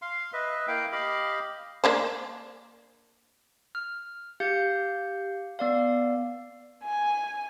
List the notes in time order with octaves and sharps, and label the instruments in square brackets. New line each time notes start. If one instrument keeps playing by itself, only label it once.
[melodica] F5 C6
B4 D#5 E5
A#3 E4 F5 G5
G4 D#5 F5 B5
[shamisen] A#3 D4 C5
[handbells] F6
G4 F5 G6 C#7
B3 D5 F5
[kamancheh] G#5